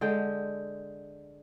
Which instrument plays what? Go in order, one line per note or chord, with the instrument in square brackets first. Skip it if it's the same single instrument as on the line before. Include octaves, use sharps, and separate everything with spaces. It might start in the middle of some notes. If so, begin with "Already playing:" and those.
[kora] D3 G#3 G5